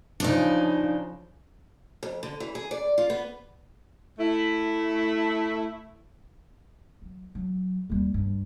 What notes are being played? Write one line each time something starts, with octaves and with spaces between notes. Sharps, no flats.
C#3 F3 D4 D#4
F2
D3
E3
G#4
D5
F4
B3
A3 E4
F#3
F#3
D#2 G3
G2